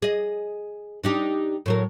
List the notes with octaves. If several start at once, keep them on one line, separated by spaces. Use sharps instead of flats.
G#4 D#5
D4 D#4 G4
A2 F#3 A#4